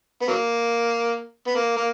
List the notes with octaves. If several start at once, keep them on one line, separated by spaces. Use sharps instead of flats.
B3
F#3 A#3
B3
A#3
A#3